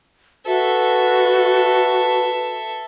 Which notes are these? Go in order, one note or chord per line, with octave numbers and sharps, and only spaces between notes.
F#4 A4 B4 E5